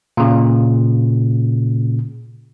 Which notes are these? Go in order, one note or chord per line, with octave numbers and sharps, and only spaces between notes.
A#2 C#3